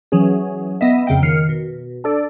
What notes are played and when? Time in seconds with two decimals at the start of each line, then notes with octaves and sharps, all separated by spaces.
0.12 E3 F#3 C#4 G#4
0.81 B3 D#5 E5
1.07 F2 C#3 A#3 G5
1.22 D#3 F6 C7 C#7
1.49 B2
2.04 D4 A4 D5